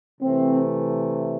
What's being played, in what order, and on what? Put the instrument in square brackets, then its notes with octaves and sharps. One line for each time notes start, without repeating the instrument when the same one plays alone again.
[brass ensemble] C3 E3 A3 C4